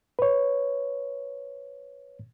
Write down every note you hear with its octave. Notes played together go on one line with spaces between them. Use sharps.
B4 C#5